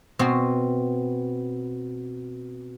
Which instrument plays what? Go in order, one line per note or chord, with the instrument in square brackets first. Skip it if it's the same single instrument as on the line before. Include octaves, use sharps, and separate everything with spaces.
[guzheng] B2 B3 C4